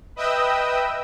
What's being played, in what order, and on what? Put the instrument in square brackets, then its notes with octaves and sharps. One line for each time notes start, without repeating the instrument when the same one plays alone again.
[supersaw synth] B4 D#5 E5 G5 D#6 E6